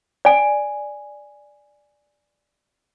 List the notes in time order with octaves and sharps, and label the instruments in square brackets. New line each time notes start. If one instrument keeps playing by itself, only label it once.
[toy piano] D5 G#5